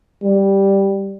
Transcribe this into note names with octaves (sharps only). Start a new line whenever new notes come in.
G3